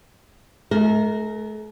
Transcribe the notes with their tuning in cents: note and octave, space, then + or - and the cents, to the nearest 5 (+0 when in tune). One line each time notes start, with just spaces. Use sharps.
A3 -45 A#4 +0